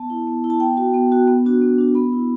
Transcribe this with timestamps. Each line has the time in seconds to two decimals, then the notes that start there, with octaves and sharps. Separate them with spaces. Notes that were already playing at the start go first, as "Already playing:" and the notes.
Already playing: B3 A5
0.10 E4
0.28 B3
0.44 E4
0.50 A5
0.60 B3 G5
0.77 F#4
0.94 B3
1.12 F#4
1.28 B3
1.46 D4 F#4
1.62 B3
1.78 D4 F#4
1.95 B3 B5
2.13 E4